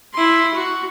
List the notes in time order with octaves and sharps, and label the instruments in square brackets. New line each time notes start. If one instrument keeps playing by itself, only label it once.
[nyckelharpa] E4 C6
F#4